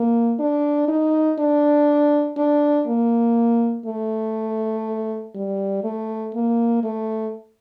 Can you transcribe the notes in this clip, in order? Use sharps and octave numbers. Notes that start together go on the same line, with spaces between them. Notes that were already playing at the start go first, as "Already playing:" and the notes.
Already playing: A#3
D4
D#4
D4
D4
A#3
A3
G3
A3
A#3
A3